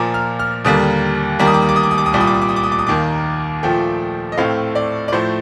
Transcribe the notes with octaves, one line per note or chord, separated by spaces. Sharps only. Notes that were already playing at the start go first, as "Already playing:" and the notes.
Already playing: A#2 F3 A#3 D6
F6
F6
D#2 D3 G3 A#3 D#6
D#2 D#3 G3 A#3 D6
D#6
D6
D#6
D6
D#6
D6
D#6
D6
D#6
C2 A#2 G3 D6
D#6
D6
D#6
D6
D#6
D6
D#6
D6
D#6
D#2 D#3 A#3 D6
A#2 F3 A3 G5
D#5
A2 A3 C4 F5
D5
D5
A2 F3 A3 C5